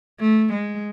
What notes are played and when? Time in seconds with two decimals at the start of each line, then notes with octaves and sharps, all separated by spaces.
0.21 A3
0.53 G#3